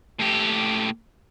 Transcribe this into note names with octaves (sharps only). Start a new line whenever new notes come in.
A2 G4